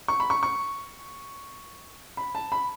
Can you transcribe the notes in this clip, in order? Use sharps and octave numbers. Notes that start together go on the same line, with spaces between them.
C#6
B5
C#6
C#6
B5
A5
B5